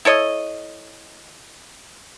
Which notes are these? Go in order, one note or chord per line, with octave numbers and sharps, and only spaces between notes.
E4 A4 C#5 D#5